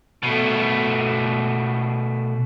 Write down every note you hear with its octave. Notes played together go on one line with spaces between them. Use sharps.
B2 A3